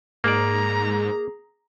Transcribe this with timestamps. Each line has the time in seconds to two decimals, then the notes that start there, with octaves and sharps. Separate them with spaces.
0.24 G#2 A#3 G#4 D5 A#5